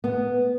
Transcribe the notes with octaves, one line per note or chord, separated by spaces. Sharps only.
B3